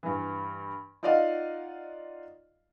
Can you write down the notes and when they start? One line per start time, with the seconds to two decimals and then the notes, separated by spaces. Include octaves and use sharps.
0.03 G2 E3
1.03 D#4 F4 D5 D#5 F5 F#5